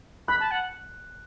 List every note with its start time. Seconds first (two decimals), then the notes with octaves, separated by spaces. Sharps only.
0.28 B5 F#6
0.40 A5
0.51 F#5